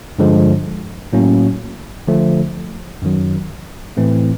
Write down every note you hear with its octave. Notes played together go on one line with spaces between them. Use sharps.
G2 D3 F3 G#3
A2 F#3 A#3 C#4
D3 F3 A3
F#2 D#3 F#3
A2 E3 A3 C4